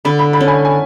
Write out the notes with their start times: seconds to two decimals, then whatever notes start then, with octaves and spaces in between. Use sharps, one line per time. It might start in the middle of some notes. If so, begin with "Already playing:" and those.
0.05 D3 B5
0.19 B5
0.33 B5
0.41 C#4
0.48 G#5 B5
0.65 G#5